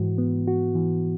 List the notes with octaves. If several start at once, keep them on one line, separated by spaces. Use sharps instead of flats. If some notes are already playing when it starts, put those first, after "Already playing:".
Already playing: G#2 E3 F#4
B3
F#4
E3